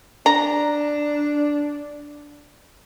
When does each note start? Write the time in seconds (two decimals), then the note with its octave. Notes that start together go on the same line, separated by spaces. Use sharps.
0.26 D4 A#5